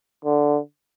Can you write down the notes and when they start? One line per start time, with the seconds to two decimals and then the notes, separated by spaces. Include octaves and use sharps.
0.25 D3